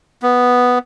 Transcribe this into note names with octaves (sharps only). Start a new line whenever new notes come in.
B3